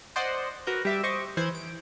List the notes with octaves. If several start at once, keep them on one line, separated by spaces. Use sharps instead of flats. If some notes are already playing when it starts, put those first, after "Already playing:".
C5 D5 D#5 F#5
F#4 A#4 B4 G6
G3 E5 D6
C5 D#5 C#6 D6
E3 C5 F#6 G#6
D7